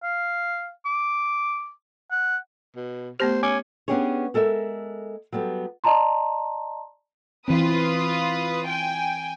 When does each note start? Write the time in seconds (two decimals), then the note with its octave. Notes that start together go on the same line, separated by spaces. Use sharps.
0.03 F5
0.85 D6
2.11 F#5
2.76 B2
3.20 A3 B3 G4 C5
3.43 C#4 G#5 D6 G#6
3.88 B3 C#4 D4 G4 G#4 C#5
4.34 G#3 A4 A#4 D#5 E5
5.32 F#3 G3 B3 A4
5.84 D5 D#5 A5 A#5 C6
7.48 E3 C4 F4 B4 D#6
8.67 G5 G#5